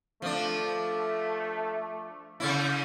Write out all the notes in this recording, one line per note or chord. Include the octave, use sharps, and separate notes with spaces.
F3 A3 D4
C#3 C#4 E4